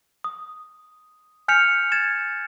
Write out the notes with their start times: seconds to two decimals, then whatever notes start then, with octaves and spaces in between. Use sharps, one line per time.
0.24 D#6
1.48 G#5 F6 G6 B6 C#7 F7
1.92 G#6 A6 E7